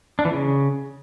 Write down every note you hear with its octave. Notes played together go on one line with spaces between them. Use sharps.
D4
E3
C#3